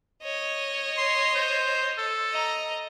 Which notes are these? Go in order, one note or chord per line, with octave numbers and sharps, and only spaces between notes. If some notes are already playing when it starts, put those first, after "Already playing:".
C#5 D#5
C6
C5
A4
D#5 A#5